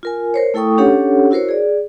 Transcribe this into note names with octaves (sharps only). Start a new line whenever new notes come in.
F4 A#4 G#5
A#4 C5 C#5
A3 E4 A4 G5 C#6 D#6
C#4 D4 G4 A4 C#5 F#5
E4 F#4 A#4 C5 C#5
G#4 D5